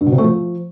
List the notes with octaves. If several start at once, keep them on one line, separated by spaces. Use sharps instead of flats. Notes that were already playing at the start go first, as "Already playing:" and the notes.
G2
B2
C3
A3
F3